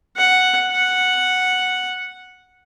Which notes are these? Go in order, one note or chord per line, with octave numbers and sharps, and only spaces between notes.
F#5
F#5